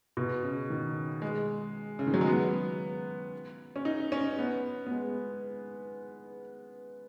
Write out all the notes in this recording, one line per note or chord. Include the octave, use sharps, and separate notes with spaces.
B2
C#3
D#3
G#3
C#3
D#3
F#3
G#3
B3
C#4
D#4
C#4
B3
B3
G#3